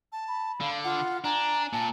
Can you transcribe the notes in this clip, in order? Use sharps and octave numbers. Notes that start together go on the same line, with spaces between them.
A5
B5
D3 F5
F4 F#5
D4 G#5 A#5
A#2 A5